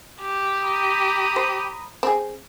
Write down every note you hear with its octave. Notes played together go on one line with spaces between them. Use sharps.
G4
A#5 B5 D#6
C5
C4 G#4